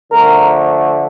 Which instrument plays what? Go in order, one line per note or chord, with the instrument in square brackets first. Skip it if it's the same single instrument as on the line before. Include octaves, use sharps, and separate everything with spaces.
[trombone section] D3 F3 A3 A#4